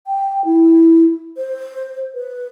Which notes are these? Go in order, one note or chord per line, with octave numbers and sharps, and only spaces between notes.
G5
E4
C5
B4